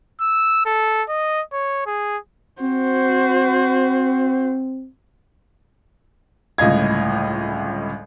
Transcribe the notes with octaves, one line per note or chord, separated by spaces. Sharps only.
E6
A4
D#5
C#5
G#4
C4 F#4 C5
G1 C#2 A2 D#5 F5 G#6